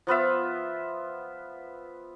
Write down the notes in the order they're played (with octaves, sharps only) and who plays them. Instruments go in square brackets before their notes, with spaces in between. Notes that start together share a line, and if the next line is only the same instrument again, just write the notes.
[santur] F3 B3 F4 E5